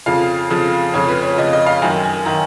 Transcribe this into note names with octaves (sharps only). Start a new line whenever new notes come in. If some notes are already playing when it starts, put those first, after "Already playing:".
F2 C#3 F3 F5
F2 C#3 F3
F2 C#3 F3 C#5
B4
C#5
F2 C#3 F3 D#5
D#5
F5
F#2 D#3 G#5
G#5
D#3 A#5